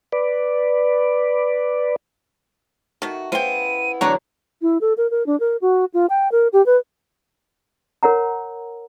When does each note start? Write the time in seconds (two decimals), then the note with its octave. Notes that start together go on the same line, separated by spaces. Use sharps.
0.12 B4 D5
3.02 D#3 A3 F#4
3.32 C#3 B3 E4 C5 G5 D#7
4.01 E2 D3 F#3 D4 F#4 C#5 A#5 C#6
4.62 E4
4.81 A4
4.97 A#4
5.11 A#4
5.26 D4
5.40 A#4
5.61 F#4
5.94 F4
6.10 G5
6.32 A#4
6.53 G4
6.66 B4
8.03 A#4 C#5 F#5 A#5